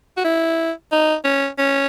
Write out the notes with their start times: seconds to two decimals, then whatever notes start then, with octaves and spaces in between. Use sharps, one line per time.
0.17 F#4
0.25 E4
0.92 D#4
1.25 C#4
1.59 C#4